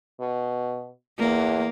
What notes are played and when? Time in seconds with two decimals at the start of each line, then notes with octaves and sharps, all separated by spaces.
0.20 B2
1.19 E2 A#3